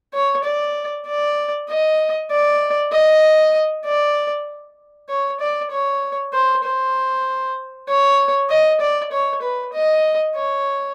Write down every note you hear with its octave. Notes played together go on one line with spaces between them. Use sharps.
C#5
D5
D5
D#5
D5
D#5
D5
C#5
D5
C#5
C5
C5
C#5
D#5
D5
C#5
B4
D#5
C#5